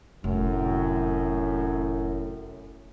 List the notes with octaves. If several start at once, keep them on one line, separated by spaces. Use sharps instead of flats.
F1 F#2 A2